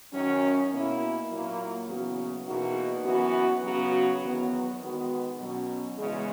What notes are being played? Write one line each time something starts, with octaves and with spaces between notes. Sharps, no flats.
F#2 D#3 F#3 C#4
B2 A#3 E4
A#2 F#3 A#3 E4
E2 C#3 F#3 B3 F#4
E2 B2 A#3 D#4 F#4
F#2 E3 B3 F#4
C#3 F#3 B3 F#4
E2 D#3 F#3 B3 F#4
D#3 G#3 B3 F#4
B2 F#3 C#4
E2 C#3 G#3